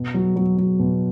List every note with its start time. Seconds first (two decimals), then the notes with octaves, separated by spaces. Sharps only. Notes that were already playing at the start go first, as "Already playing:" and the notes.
Already playing: B2
0.14 F#3
0.36 F#3
0.58 F#3
0.80 B2